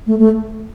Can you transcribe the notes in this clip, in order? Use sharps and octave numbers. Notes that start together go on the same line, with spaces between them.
A3
A3